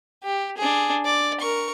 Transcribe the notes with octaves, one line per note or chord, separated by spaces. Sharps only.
G4
D4 G#4
D5
A#4 C#6